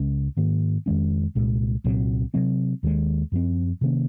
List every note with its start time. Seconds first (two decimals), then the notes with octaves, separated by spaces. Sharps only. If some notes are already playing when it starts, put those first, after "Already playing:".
Already playing: C#2 C#3 G#3 C#4
0.37 G#2 D#3 A#3
0.86 F2 D#3 G#3 C#4
1.35 C2 A#2 G#3
1.84 C2 A#2 F#3 C4
2.34 C3 F#3 C4
2.83 D#2 D#3 G#3
3.32 F#2 F3 C4
3.81 C3 D#3 A#3 C#4